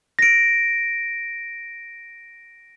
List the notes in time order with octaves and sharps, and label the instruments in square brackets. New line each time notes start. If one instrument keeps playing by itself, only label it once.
[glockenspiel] A#6 D7